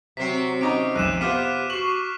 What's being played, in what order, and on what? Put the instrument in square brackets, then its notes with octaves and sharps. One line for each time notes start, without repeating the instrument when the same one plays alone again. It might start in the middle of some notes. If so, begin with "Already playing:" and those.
[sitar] C3 C4 [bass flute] F#3 [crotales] B6 C7
[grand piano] C#4 D#4 A#5 [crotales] D6 D7
[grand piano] B1 F2 [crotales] F#6 D#7 E7
[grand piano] B3 F4 C5 [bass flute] G4 [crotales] D6 F6 B6
[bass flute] F#4 [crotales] C#6 [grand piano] C7 F#7